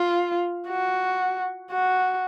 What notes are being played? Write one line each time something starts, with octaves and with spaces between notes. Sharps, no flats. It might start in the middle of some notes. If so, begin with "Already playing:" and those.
Already playing: F4
F#4
F#4